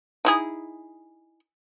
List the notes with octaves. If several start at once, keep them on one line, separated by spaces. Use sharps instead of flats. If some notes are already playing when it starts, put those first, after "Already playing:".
D#4 E4 G#4